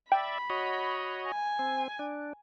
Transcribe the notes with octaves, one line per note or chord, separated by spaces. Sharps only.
D5 E5 G5 B5
F#4 C#5 D#5
G#5
C4
D4